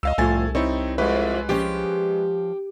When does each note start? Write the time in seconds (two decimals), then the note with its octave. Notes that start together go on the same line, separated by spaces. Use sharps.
0.03 C#2 D#5 F5 E6
0.18 C2 F2 A2 A3 F4 G#5 A6
0.55 C4 D#4 E4 C#5
0.98 F2 G#3 E4 G4 B4
1.49 F3 C#4 G4